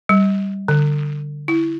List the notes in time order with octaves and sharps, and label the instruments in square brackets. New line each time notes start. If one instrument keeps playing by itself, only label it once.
[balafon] G3
D3
E4